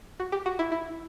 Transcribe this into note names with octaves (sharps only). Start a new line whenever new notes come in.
F#4
G4
F#4
E4
E4